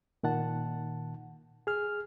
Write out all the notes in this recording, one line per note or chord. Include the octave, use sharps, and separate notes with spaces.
A#2 D#3 F#5 A5
G#4 F6